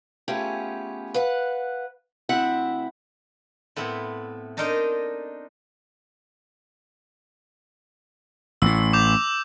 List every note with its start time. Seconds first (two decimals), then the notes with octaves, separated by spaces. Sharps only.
0.28 A3 B3 C#4 F4 G4 G#4
1.14 B4 F5 F#5
2.29 D2 C4 E4 E5 F#5
3.76 A2 B3 C4 E4
4.57 D4 D#4 A4 A#4 C5 D#5
8.62 A1 A2 E6
8.93 D6 G6 F7